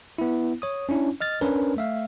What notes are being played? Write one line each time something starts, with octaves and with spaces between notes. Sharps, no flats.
B3 E4
C#5 D#6
C#4 D4 E4
D#5 F6 A6
C#4 D4 A#4 B4 C#5
A3 E5 F5